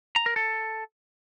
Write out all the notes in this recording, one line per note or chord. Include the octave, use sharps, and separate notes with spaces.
A#5
A#4
A4